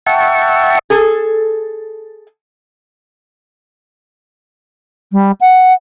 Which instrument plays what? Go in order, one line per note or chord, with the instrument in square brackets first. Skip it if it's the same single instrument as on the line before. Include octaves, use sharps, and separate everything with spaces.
[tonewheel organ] E5 F#5 G5 A5 C#6
[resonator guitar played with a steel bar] G#4 A4
[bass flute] G3
F#5